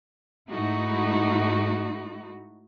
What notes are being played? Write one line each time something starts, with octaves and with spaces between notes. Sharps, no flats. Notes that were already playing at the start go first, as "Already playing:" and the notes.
G#2 A3 D#4 E4 F#4